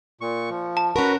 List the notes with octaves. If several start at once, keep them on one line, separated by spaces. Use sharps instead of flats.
A#2 C#6
F3
A5
C#4 F#4 A#4 B4